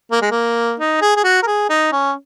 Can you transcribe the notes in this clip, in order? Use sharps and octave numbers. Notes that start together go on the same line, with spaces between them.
A#3
G#3
A#3
D#4
G#4
G#4
F#4
A#4
G#4
D#4
C#4